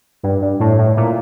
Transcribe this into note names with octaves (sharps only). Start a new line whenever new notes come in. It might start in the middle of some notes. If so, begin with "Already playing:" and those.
G2
G2
A2
A2
A#2